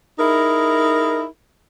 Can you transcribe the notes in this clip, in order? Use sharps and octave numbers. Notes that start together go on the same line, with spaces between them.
D#4 E4 G#4 A#4